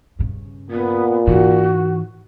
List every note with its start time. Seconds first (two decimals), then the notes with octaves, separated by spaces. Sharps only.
0.19 G2 C#3
0.70 A#2 B3
1.27 G#2 E3 F#4